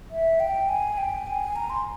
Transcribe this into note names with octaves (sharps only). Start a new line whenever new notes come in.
E5
G5
G#5
G5
G#5
A#5
C6